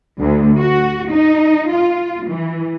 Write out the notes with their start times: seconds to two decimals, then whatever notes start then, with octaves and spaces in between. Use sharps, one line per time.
0.19 D2
0.58 F#4
1.11 D#4
1.70 F4
2.29 E3